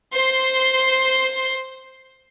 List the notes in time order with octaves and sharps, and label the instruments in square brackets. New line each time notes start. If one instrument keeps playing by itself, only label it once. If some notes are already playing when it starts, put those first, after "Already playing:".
[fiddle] C5 C6